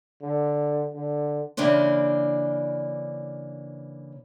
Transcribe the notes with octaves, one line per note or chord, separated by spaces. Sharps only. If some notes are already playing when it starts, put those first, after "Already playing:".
D3
D3
C#3 E3 A#3 D4 C5